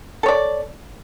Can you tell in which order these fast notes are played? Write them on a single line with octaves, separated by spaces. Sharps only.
A4 C#5 D5